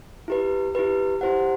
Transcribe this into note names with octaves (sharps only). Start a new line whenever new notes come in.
E4 G4 B4
E4 G4 B4
E4 G4 C5 F#5